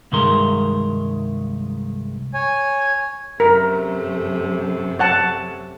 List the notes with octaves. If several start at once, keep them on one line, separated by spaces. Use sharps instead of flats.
C2 G2 D#3 G#3 A#4 C6
C#5 G#5
F#2 C3 A3 A#4
C#5 F#5 A5